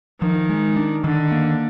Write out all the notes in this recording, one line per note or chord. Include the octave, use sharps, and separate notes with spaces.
D#3 F3
G#3
D4
D3 D#3
A#3